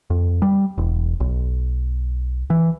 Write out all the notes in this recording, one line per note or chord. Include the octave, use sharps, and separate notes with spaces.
F2
G3
E1
B1
E3